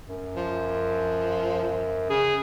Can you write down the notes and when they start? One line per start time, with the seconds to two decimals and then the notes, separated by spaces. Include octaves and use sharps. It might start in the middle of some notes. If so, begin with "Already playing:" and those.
0.08 F#2
0.36 F3
2.10 C#3 G#4